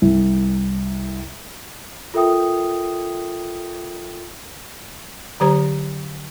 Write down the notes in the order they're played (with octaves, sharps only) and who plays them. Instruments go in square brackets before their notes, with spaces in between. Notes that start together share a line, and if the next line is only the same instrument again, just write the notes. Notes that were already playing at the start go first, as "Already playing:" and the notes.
[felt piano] C2
[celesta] F4 A4 A#4 E5 G5 D#6
[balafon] D3 F#3 G4 C5 A#5